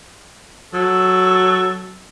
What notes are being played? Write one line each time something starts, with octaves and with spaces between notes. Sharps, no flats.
F#3 A4